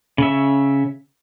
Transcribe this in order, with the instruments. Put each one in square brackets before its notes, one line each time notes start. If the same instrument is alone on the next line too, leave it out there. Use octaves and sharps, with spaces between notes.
[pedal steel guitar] C#3 E5